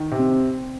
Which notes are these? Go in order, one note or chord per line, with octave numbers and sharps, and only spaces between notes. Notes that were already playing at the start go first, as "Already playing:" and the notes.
Already playing: D#3
C3
C4